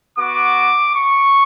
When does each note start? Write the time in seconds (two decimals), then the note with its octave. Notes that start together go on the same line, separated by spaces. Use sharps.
0.18 B3 F#4 D6
0.95 C#6